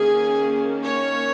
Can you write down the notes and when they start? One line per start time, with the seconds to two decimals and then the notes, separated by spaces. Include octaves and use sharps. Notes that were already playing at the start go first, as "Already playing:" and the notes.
Already playing: D#3 A#3 C#4 G#4
0.84 C#5